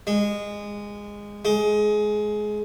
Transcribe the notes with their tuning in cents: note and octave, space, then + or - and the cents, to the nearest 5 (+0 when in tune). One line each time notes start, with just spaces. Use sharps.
G#3 -15
G#3 +20